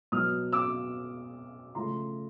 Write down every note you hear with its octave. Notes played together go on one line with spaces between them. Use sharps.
B2 F#3 B3 D#6 F6
D6 E6
C#3 F3 A3 C#4 A#5 C6